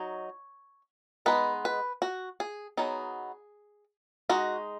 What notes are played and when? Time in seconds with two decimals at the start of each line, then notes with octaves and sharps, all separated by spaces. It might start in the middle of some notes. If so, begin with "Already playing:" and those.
Already playing: F#3 D#4 C#5
1.26 G#3 B3 D#4 B4
1.65 B4
2.02 F#4
2.40 G#4
2.77 F#3 B3 D#4 G#4
4.29 G#3 D#4 F#4